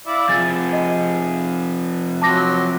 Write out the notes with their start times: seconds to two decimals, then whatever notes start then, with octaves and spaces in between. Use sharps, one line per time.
0.07 E4 D5 F5
0.29 C3 F3 G#4 A6
0.73 D#5
2.22 F#3 C4 A5 D6 A#6